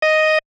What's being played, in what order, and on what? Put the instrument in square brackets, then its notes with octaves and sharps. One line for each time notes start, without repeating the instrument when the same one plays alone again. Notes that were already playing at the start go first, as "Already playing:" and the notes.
[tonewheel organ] D#5